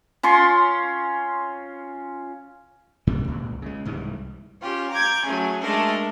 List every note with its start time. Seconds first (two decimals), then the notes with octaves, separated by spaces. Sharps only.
0.23 C#4 F4 C6 C#6
3.07 G2 C3 D#3 G3
3.28 C#2 A#2
3.62 C#3 G#3
3.85 C2 G#2 E3 G3
4.61 C#4 F4 G4
4.92 A#5 D6 G6 G#6
5.24 F#3 A3 C#4 G#4
5.62 G#3 A3 D4 A4 A#4